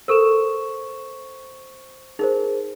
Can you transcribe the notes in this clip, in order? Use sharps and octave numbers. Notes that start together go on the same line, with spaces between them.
A4 A#4 C5 C#6 E7
D#4 G#4 A#4 C5